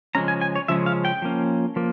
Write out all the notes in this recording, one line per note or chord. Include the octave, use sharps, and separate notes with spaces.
C#3 F3 G#3 C#4 A#5
G#5
G#5
C#5
C#3 F3 G#3 C#4 E5
F5
G5
F3 A#3 C#4
F3 A#3